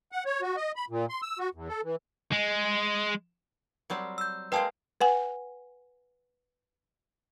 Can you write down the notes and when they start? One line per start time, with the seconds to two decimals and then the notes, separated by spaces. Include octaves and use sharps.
0.12 F#5
0.26 C#5
0.42 F#4
0.57 D#5
0.76 B5
0.90 A#2
1.09 C6
1.22 E6
1.39 F#4
1.55 E2
1.69 A4
1.83 E3
2.32 G#3
3.90 F#3 G3 C4
4.18 E6 G6
4.52 G#3 A#3 B4 C5 G5 A5
5.01 B4 F#5 G#5